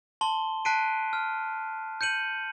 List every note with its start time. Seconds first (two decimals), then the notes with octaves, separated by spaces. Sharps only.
0.21 A5 C6 G7
0.65 A5 F#6 B6 C7 D7 D#7
1.13 F6
2.01 G6 C#7 D#7 F#7